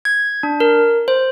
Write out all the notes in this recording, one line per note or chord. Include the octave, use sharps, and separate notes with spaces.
G#6
D4
A#4
C5